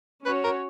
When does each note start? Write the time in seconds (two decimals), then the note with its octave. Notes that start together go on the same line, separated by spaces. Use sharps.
0.26 C#4 F#4 B4 C#5
0.44 A#4